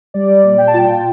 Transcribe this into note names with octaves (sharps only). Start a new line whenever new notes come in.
G3 D5
A#2
G5
A5
F4 G5